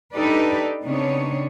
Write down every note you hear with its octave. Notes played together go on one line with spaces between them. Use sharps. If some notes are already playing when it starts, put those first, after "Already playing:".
D4 D#4 G4 A4 B4 D5
C#3 B3 C4 D4 D#4 C#5